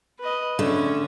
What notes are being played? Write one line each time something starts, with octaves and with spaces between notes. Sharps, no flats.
B4 D#5
D3 A3 C#4